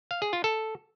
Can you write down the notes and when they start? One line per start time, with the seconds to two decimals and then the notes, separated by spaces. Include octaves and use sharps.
0.11 F5
0.22 G#4
0.33 F4
0.44 A4